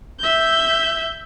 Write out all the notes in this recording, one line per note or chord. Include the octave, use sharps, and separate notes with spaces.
E5 G6